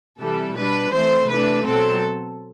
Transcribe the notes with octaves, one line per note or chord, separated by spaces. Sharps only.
C3 E3 G3 A4
B2 G3 D4 B4
E3 A3 C4 C5
C3 E3 A3 D4 B4
B2 F#3 C4 A4